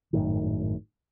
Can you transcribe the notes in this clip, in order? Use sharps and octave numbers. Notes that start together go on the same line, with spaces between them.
G#1 F#2 A2 D#3